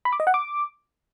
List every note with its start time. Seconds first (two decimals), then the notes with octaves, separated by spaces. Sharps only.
0.05 B5
0.13 D6
0.20 D#5
0.27 F#5
0.34 D6